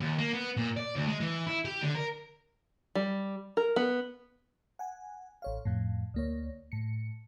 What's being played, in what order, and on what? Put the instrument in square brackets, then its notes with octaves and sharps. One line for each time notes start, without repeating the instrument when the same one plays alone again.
[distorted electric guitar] D#2
A#3
B3
A#2
D5
D2
G#3
E3
E4
G4
D3
A#4
[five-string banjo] G3
A#4
B3
[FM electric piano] F#5 G#5
A1 C#5 F5
F2 A2
D2 A#3 C#5
A2 C#7